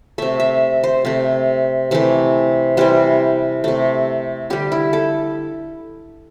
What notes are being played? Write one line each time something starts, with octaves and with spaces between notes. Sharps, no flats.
C3 A3 E5
E5
C5
C3 A3
C3 E3 A3
C3 E3 G3 C5
C3 A3
D3 G3 G4
E4
A4